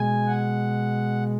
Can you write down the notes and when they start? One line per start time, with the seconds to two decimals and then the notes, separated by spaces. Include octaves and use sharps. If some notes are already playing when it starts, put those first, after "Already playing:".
Already playing: B2 G#3 G#5
0.27 F#5